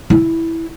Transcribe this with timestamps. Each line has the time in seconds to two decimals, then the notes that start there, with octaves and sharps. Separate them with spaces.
0.10 E4